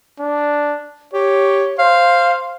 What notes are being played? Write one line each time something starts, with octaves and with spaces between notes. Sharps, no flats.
D4
G4 C#5
C5 F5